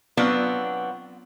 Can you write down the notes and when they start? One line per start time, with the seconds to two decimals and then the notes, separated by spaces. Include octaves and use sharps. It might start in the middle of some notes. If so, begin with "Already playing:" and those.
0.17 F#3 B3 C4 D4 F4